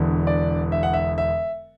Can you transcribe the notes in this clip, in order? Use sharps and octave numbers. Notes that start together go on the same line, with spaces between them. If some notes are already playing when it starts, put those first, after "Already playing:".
Already playing: E1 E2 D3
D5
E5
F#5
E5
E5